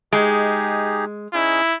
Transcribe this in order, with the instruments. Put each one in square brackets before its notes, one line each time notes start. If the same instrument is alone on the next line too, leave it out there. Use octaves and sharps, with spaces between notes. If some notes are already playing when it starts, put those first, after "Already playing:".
[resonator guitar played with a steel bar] G#3 [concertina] D#4 G4 G#4
[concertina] C#4 D#4 G#4 [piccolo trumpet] E4